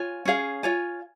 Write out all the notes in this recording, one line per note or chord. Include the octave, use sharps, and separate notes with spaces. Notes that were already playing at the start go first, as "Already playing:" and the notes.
Already playing: F4 C#5 G#5
C#4 G#4 F5
F4 C#5 G#5